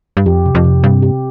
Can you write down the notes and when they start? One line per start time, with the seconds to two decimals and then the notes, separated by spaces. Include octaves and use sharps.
0.17 G2
0.26 F2 G4
0.46 C3
0.55 F2
0.64 C3
0.83 G2 C3
1.02 G4
1.12 C3